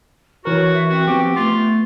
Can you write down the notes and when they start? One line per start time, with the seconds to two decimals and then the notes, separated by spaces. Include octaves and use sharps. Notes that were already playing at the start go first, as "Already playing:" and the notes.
0.45 E3 F#4 A#4 C#5
0.73 E5
0.89 C4 F#4
1.07 F3 B3 G4
1.36 A3 B3 F4